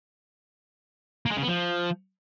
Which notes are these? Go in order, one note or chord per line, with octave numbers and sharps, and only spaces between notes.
A#3
G#3
C#3
B3
F3